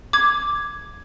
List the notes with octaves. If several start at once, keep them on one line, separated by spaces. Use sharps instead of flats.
D6 G#6